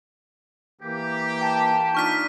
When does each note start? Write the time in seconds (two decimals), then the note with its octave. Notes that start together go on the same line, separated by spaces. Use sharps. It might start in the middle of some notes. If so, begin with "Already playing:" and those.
0.81 E3 A#3 G4
1.41 G5 A5
1.95 D4 D#4 F4 C#6 F6 B6